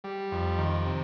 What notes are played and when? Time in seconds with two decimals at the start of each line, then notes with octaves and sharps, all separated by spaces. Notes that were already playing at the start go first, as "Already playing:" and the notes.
0.04 G3
0.32 F2
0.58 D#3
0.86 C3